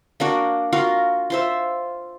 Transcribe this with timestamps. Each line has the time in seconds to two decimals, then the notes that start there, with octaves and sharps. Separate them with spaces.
0.20 A#3 D4 F#4
0.73 F4 F#4 A#4 F5
1.30 F4 C5 E5